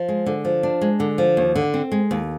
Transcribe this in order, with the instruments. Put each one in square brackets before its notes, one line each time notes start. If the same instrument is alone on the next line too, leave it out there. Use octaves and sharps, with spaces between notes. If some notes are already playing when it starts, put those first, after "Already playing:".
Already playing: [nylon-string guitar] F3
G#3
D3
F3
D4
G#3
D3
F3
D#2
D3
C4
G#3
D#2